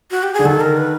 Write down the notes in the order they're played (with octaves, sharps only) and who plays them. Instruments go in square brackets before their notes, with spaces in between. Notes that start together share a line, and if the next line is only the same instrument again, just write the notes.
[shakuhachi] F#4
G4
G#4
[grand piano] D3
[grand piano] D#3 [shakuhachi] A4
[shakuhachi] A#4
B4